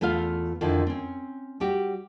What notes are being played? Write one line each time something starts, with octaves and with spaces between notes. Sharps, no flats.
E2 A3 B3 F4 F5
F2 D3 D#3 F3 E4
C4 C#4
G3 F#4 G4